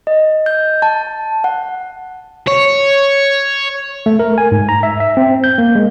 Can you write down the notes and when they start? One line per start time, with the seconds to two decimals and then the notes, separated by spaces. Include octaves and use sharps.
0.07 D#5
0.46 G6
0.82 A5
1.44 F#5
2.47 C#5
4.06 A3
4.19 A#4
4.38 G#5
4.52 G#2
4.69 A#5
4.83 E5
5.00 E5
5.17 C4
5.44 G6
5.58 A#3
5.75 G#3